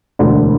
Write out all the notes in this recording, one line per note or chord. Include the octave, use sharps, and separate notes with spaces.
E1 D2 D3